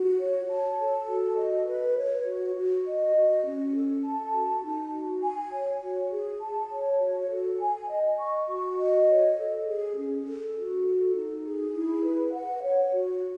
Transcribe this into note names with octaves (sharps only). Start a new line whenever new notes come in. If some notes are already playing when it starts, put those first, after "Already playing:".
Already playing: F#4
C#5
A5
A4
F#4
D#5
B4
C#5
F#4
F#4
D#5
F#4
C#4
A4
A5
F#4
D#4
F#4
G#5
C#5
F#4
G#4
A5
C#5
F#4
A4
G#5
D#5
C#6
F#4
D#5
C#5
A4
G#4
C#4
A4
F#4
A4
D#4
G#4
E4
B4
F#5
C#5
F#4